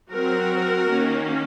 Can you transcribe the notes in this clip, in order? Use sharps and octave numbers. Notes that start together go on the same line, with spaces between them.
F#3 C4 F#4 A#4
D#3 A#3 C#4